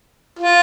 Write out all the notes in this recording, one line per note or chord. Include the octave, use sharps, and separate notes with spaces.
F4